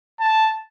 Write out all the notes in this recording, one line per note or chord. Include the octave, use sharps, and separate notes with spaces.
A5